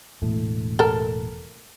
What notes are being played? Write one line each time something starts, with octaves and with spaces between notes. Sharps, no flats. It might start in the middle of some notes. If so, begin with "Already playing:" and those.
E1 A2 A3
A4 A#4